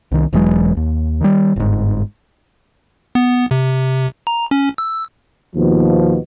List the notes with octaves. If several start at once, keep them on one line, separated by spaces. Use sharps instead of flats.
C2 D#3
E1 E3 F#3 G#3
D#2
D#3 G3
G1 G#2
B3
C3
A#5
C#4
E6
D#2 B2 F3